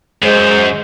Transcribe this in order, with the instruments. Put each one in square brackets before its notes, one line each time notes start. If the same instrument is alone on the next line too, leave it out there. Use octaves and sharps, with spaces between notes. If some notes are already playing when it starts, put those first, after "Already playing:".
[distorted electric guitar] F#2 [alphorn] G#3 [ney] C5